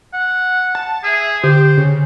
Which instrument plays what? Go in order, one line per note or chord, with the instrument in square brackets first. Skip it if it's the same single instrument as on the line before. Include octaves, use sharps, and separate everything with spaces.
[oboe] F#5
[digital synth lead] A5
[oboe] G#4 [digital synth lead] E5
[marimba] D3 [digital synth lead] G4 [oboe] C5
[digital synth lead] C#3